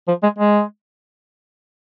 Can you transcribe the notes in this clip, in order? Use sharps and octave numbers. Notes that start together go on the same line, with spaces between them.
F3
G#3
G#3